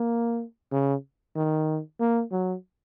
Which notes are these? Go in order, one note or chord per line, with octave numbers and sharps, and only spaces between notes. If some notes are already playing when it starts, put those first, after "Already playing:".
Already playing: A#3
C#3
D#3
A#3
F#3